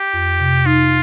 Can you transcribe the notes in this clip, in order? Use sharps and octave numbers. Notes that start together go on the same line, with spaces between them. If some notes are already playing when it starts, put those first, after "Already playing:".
Already playing: G4
F2
C3
D#4 F4